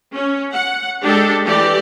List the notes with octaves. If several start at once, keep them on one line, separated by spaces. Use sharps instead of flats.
C#4
F#5
G#3 D4 G4 A4
E3 A3 G4 D5